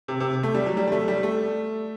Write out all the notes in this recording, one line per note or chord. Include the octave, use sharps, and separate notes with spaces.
C3
C3
A3
G3
F#3
G3
G3
A3
G3
A3